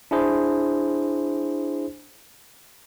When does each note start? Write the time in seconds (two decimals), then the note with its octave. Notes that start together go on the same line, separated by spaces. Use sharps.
0.11 D4 E4 G#4 C5